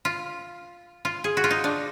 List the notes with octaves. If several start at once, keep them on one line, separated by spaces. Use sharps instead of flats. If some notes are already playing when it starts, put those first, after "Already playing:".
F4
F4
G#4
F#4
F4
D#4
D4